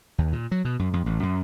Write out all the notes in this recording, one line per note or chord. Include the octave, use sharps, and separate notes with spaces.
D#2
A#2
F#3
B2
F#2
F2
A1
F#2